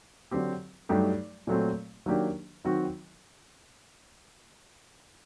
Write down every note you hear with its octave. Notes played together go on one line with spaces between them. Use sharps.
D3 F#3 C4 G4
G2 F#3 A3 D#4 G4
A#2 F#3 A3 C4
D#3 F#3 A#3 D4 G4
D#3 F#3 C4 F#4